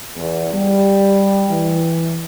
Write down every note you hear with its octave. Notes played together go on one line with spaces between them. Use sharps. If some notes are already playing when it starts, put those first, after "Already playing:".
E2
G3
E3